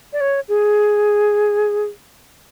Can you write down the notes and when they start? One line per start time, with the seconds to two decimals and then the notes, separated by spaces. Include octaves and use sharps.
0.13 D5
0.21 C#5
0.48 G#4